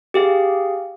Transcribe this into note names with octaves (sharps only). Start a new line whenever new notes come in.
G4 G#4 F5